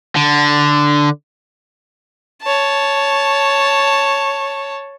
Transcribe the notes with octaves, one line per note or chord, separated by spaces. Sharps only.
D3
C#5 A5